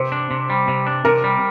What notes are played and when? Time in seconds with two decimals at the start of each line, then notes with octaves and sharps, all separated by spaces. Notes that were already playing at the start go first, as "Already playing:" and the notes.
Already playing: C3 C5
0.12 D4
0.31 C3
0.50 G3
0.68 C3
0.86 D4
1.05 C3 A#4
1.24 G3